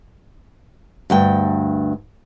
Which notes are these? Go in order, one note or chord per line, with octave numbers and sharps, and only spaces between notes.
D2 G2 G5